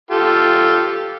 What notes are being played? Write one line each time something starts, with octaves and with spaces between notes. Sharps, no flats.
F4 G4 A4